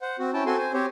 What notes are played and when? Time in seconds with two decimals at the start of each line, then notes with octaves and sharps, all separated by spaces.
0.01 C5 F#5
0.19 C4 F#4
0.33 C#4 E4 G5 A5
0.46 C4 F#4 A4 G#5 C6
0.57 C5 G#5
0.74 C4 G4 C5 C#5